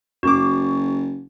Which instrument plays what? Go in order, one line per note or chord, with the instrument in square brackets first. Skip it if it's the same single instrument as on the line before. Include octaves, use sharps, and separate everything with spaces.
[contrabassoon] F#1 [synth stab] F#2 D6 [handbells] F#4